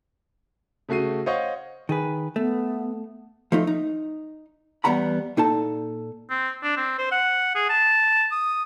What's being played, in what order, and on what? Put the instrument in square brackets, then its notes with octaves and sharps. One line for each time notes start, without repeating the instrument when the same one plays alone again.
[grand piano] C#3 A3 F#4 C7 D#7
C5 C#5 D#5 F5 F#5 C#6
[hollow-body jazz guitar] D#3 G#4 B4
[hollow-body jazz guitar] A3 [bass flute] B3
[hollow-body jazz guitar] F3 A3 D#4
D#4
E2 G3 B3 F#5 A#5 B5
A#2 D#4 A4 A5
[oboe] C4
D4
C4
C5
F#5
G#4
A5
D#6